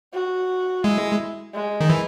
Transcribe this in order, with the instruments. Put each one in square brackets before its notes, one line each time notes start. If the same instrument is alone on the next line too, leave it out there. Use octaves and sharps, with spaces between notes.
[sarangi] F#4
[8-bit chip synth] G#3 [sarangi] E4
[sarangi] G#3
[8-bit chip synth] D#3
E3